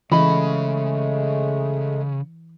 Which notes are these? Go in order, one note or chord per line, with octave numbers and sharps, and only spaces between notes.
C#3 E3 G#3 A3 D#5 B5